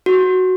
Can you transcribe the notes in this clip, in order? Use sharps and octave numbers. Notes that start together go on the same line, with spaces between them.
F#4